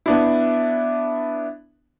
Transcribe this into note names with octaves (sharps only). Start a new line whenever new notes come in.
B3 D4 E4